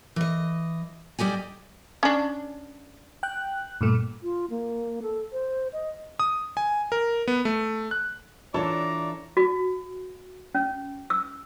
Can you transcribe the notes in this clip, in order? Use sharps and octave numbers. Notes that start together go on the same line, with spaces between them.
E3 D#5
G3 G4 D#5 G#5
C#4 D4
G5 F#6
G2 A#2 A3
F4
A#3
A4
C5
D#5
D#6
G#5
A#4
B3
A3
F#6
E3 D4 F4 A4 C#5 D5 A5 A#5
F#4
C#4
E6